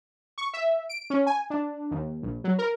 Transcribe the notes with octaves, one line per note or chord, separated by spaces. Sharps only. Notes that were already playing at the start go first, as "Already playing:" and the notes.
C#6
E5
D7
C#4
G#5
D4
D#2
A#1
F#3
A#4